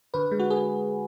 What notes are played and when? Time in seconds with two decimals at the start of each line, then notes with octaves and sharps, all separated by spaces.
0.14 D3 B4
0.31 G#3
0.39 F#4
0.50 G#4